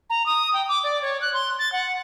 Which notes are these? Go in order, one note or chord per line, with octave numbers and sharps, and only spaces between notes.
A#5
D#6
G5
D6
D5
C#5
F#6
C6
A6
F#5